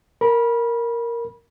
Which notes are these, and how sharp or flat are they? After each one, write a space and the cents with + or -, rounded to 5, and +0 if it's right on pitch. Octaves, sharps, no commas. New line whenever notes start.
A#4 +0 B5 -25